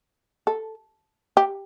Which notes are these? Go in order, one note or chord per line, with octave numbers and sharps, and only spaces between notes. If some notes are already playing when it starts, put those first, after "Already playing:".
A4
G4